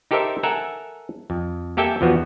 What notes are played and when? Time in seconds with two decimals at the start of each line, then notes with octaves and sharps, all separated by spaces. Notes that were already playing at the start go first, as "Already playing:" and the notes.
0.11 D#4 G4 A4 A#4 C5 E5
0.43 A4 A#4 E5 F#5 G#5 A#5
1.30 F2
1.77 A#3 G4 A4 E5 G5 G#5
2.01 E2 F3 B3 F#4